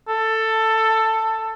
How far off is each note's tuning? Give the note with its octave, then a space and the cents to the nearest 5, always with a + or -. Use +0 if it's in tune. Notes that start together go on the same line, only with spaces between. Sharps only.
A4 +15